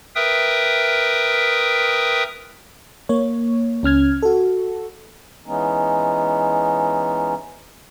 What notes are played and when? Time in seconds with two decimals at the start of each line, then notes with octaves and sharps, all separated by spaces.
0.16 A#4 B4 E5 G5 D#6
3.09 A#3 C#5
3.83 C#2 C#4 F6 G#6
4.23 F#4 A4
5.46 E3 G#3 B3 C#4 D#4